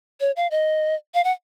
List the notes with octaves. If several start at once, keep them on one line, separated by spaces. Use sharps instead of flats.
C#5
F5
D#5
F5
F#5